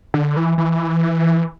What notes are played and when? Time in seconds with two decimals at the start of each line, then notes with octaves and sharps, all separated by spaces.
0.14 D3
0.37 E3
0.58 E3